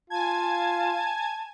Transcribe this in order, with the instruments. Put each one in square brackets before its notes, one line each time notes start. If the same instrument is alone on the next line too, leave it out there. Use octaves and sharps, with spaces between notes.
[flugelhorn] F4 [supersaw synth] G#5 G#6 [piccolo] A5